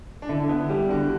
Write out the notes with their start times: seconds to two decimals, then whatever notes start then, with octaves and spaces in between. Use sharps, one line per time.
0.22 D4
0.29 D3 E4
0.49 B3 E4
0.69 G3 G4
0.89 D3 F#4